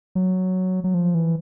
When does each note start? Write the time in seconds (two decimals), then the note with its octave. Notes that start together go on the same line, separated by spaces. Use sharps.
0.15 F#3
0.84 F#3
0.94 F3
1.15 E3